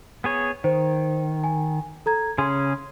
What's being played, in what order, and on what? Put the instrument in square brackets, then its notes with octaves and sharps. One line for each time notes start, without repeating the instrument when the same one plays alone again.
[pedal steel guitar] B3 G#4 C#5
[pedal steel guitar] D#3 [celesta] C5
[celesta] G#5
A4 A#5 G#6
[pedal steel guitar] C#3 C#4 G#4 [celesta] C6